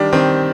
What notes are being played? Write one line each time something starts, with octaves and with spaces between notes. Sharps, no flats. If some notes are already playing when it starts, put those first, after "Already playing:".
Already playing: D#3 G3 D4
D#3 C4